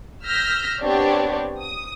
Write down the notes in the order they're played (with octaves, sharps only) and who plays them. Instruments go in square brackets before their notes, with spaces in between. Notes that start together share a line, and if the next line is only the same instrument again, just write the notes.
[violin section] E6 F6 G6 A#6 B6
B3 C4 D4 G4 C#5 D5
D#6